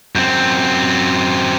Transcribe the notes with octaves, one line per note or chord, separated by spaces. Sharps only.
F#2 C4